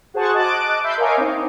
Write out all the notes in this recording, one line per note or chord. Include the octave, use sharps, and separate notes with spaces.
F#4 G#4 C5 F#5 A5 C#6
D#5 A5 D6 F#6 A6 D7
E5 B5 C6 E6 G6
A#4 C#5 D#5 F5 G#5 D6
C4 D#4